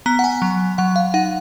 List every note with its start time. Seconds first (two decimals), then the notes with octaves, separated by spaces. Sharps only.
0.06 B3 A#5
0.19 F#5
0.24 G#5
0.42 F#3
0.78 F#3 F#5
0.96 F5
1.14 D#4 F#5